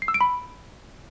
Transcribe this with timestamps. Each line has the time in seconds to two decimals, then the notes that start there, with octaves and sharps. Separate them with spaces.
0.02 C7
0.08 E6
0.14 D7
0.21 B5